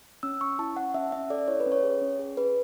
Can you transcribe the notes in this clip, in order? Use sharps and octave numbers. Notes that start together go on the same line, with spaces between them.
C#4 E6
C#4 C#6
E4 A5
C#4 F#5
C#4 E5
C#4 E5
A4 D5
E4 C#5
B4
C#4
C#5
G#4
C#4
G#4
G#4 B4